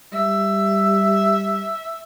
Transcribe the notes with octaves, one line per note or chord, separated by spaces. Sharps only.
G3 E5